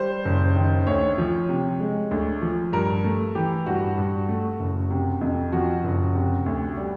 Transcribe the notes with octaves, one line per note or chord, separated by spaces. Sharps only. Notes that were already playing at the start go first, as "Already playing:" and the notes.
Already playing: G3 C5
F#1
D#3
D2 C#5
F3
C3
G#3
D2
F3
G2 A#4
A3
E3 G4
G2 F#4
G2
A3
F#1
C3
F2
F3 F#4
F#1
C3
D2
G3